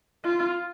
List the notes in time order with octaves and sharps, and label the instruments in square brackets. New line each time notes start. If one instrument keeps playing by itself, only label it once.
[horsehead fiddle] F4